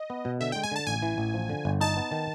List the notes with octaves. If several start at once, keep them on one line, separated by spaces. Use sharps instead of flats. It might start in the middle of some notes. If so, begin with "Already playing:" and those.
Already playing: D#5
B3
B2
D3 E5
G#3 G5
G#5
D3 A5
A1 G#5
E3
A1
F3
D3
G1
D#4 A5
B3
D#3